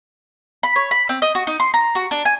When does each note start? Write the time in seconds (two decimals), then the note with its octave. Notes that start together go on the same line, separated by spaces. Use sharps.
0.63 B5
0.76 C#5
0.91 B5
1.09 C4
1.22 D#5
1.35 F#4
1.47 D#4
1.60 C6
1.74 A#5
1.95 F#4
2.11 D4
2.25 G#5